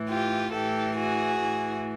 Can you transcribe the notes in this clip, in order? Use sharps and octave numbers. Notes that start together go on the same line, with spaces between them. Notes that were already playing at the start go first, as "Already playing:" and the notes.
Already playing: A2 E3
F4 G4
A2 E3 G4 A4
F#4 G#4
A2 E3